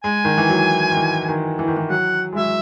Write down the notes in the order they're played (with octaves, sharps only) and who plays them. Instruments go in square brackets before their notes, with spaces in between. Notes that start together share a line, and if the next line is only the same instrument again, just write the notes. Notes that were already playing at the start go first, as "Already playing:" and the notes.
[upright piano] G#3 [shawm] G#5
[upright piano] D#3
E3
F#3
D#3
E3
D#3
E3
D#3
E3
[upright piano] F#3 [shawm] F#5
[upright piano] G#3
[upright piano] F#3 [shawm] E5